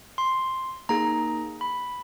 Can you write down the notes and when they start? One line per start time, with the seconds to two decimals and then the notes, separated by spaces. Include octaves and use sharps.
0.18 C6
0.89 A#3 D#4 G#4 A#5
1.61 B5